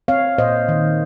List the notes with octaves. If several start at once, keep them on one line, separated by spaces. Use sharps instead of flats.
C4 C#5 F5
A#2 C5 D#5
D#3